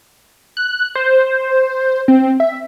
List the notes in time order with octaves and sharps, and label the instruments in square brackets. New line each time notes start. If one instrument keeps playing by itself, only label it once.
[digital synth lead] F#6
C5
C4
E5